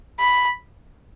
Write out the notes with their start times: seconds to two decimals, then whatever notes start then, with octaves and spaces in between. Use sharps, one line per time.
0.20 B5